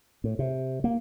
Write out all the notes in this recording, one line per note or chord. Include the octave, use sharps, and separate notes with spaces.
A2
C3
A#3